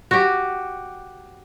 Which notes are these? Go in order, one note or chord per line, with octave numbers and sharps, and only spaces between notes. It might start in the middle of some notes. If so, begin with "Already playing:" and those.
F#4 G4